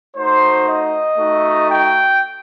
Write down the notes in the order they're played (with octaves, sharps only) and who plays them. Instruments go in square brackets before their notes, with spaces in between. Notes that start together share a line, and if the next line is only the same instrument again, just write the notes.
[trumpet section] A3 D#4 F#4 C5
D#5
A3 D#4 F#4
G5